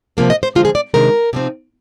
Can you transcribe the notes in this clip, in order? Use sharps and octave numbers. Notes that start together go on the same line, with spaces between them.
C3 F3 A#3 D4
D#5
C5
D3 F3 G#3 F4
G#4
D5
C3 D#3 G#3 D4 A#4
C3 F3 C4 D#4